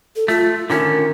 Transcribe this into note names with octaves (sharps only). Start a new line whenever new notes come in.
A4
A3 F4
D3 D#3 C#4 A#4